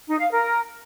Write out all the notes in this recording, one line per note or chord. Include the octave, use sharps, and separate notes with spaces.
D#4
F5
A#4